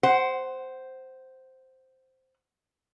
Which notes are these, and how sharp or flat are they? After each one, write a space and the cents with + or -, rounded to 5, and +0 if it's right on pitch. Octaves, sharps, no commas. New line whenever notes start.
C5 +0 F#5 +25